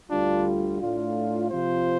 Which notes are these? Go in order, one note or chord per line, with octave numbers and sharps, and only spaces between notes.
D2 D3 G3 D4 F4
A2 A3 D4 F4
C3 F3 C4 F4 C5